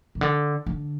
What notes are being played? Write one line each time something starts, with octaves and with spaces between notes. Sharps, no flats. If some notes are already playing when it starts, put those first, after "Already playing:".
C3
D3
D3